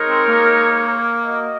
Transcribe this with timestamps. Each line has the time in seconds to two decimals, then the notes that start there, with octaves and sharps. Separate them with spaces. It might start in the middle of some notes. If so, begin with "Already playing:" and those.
Already playing: G#3 D#4 A#4 C#5
0.09 C4
0.28 A#3
1.25 F#4 A#4 D#5